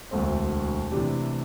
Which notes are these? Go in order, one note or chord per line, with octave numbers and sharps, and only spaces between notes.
E1 D2 D3 A3 C4
C3 E3 A3 D4 G4